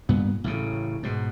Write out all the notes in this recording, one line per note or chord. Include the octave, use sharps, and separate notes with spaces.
G2 A#2 B3
A1 A2 C#3
G#2 B2